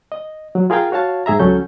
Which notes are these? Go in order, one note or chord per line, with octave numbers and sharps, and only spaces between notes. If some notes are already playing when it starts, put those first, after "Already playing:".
D#5
F#3
F4 G#4 A#4 F5 G5
F#4 C#5 F5 A5
G#2 G#4 E5 A#5
C#2 F#3 C#4 A4 G6